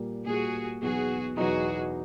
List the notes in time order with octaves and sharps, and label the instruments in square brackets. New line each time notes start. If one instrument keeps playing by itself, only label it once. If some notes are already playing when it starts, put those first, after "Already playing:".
Already playing: [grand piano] A#2 G3 A#3
[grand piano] A#2 G3 A#3 [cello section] F#4 G#4
[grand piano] E2 B2 F#3 B3 D#4 [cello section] F#4 G#4
[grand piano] E2 B2 F#3 B3 D#4 [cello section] F#4 G#4